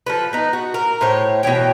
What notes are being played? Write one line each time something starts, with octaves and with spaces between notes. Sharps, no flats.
F3 A4 B4
B3 D#4
F#4
A#4
A2 C5 C#5
B2 E3 C#5 G5